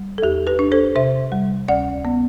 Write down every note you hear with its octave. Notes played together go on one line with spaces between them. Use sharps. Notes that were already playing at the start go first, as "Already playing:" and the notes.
Already playing: G3
A4
E2 G4
G4 B4
D4
A4 C5
C3 C5 E5
G3
D2 D5 F#5
B3